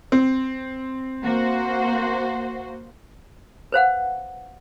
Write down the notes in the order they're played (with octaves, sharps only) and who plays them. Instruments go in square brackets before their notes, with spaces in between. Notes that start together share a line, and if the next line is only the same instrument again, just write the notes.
[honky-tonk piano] C4
[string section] A#3 F#4 C5
[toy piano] B4 C5 F5 F#5